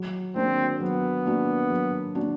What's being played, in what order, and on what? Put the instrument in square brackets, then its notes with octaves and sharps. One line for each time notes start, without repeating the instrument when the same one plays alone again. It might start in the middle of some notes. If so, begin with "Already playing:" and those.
Already playing: [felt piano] F#3
[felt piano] A#3 D4 F#4 [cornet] C4
[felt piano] F#3 [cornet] B3
[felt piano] A#3 D4 F#4
F#3
A#3 D4 F#4